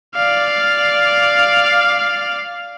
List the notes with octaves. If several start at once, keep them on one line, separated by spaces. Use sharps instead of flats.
D5 F5